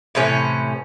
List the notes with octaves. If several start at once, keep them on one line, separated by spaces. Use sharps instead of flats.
A2 C3 E3 C#4